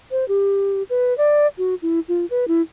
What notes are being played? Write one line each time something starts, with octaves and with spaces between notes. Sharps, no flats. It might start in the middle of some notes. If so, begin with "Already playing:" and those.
C5
G4
B4
D5
F#4
E4
F4
B4
E4